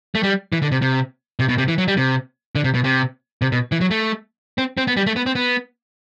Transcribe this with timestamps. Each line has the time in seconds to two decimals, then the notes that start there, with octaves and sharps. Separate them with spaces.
0.15 A3
0.23 G3
0.52 E3
0.62 D3
0.72 C3
0.82 C3
1.40 C3
1.49 B2
1.58 C3
1.68 E3
1.78 F#3
1.88 G3
1.97 C3
2.55 D3
2.64 C3
2.74 B2
2.84 C3
3.42 C3
3.52 B2
3.72 E3
3.81 F#3
3.91 A3
4.58 C4
4.77 C4
4.87 B3
4.97 G3
5.06 A3
5.16 B3
5.26 C4
5.35 B3